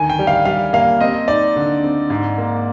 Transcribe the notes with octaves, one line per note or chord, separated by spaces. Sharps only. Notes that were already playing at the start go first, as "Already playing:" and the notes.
Already playing: D2 D#3 G#5
G5
G3
F5
G3 F5
A#3 F5
C4 D#5
D#4 D5
D3
C4
G#2
A#3